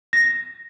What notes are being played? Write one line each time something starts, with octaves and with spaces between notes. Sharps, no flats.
A#6